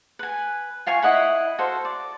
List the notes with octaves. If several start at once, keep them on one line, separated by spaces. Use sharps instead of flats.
B4 G#5
F4 F5 G#5 C#6
E4 D#5 F#5 B5
F#4 A4 C5 F5
D5